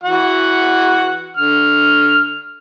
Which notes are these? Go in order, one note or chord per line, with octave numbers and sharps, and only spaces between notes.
E3 F#4 F#5
D3 F6